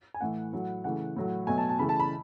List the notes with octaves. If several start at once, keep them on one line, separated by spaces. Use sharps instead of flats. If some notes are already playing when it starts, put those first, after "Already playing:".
G#5
A2 E3 A3 F#5
A2 F#3 A3
C#3 E3 A3 F#5
A2 F#3 A3
B2 F#3 A3 G#5
A5
A5
C#3 E3 A3 B5
A5
B5